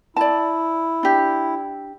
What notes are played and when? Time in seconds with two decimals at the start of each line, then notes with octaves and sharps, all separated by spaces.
0.16 E4 D5 A5
1.03 D4 G4